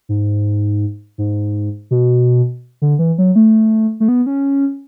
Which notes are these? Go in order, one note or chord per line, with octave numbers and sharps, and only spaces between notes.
G#2
G#2
B2
D3
E3
F#3
A3
A3
B3
C#4